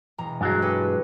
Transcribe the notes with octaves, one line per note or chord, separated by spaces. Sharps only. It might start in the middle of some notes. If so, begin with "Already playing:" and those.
E1 A#5
G2 F#3 G#3
G4 A4 B4